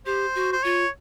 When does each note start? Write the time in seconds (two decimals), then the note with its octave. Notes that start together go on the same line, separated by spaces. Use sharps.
0.06 G4 C5
0.35 F#4
0.52 C5
0.63 F4 C#5